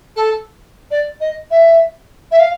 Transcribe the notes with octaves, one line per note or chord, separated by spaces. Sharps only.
A4
D5
D#5
E5
E5
F5